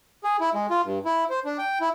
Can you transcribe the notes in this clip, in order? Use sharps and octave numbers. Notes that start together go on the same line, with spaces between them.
G#4
E4
G#3
F4
G2
E4
C5
D4
G5
E4